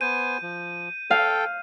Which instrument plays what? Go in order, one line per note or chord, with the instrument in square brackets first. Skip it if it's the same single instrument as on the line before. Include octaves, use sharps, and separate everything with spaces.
[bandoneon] B3 C5 G#5 [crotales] G6 D#7
[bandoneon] F3
[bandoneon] A4 G5 [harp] F5